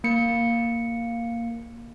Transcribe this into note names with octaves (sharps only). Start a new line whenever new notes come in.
A#3 C#7